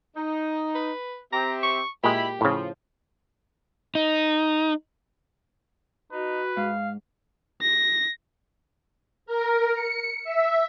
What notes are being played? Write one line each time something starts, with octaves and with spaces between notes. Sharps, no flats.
D#4
B4
C4 G4 E5 A#5
C#6
A#2 G#3 E4 G4 B5
A2 C#3 F3
D#4
D#4 F#4 B4
G#2 F5
A#6
A#4
C#7
E5